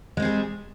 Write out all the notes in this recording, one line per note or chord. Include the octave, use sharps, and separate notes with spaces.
G3 G#3 C4 G#4